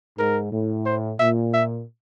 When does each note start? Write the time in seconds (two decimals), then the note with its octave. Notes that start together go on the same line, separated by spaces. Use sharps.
0.18 G#2 A#4
0.52 A2
0.86 C5
1.20 A#2 E5
1.54 E5